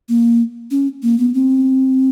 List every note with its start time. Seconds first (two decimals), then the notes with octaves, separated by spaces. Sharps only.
0.09 A#3
0.71 C#4
1.02 A#3
1.18 B3
1.34 C4